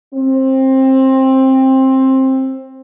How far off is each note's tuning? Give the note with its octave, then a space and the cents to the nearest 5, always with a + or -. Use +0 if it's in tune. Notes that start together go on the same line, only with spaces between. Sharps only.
C4 +20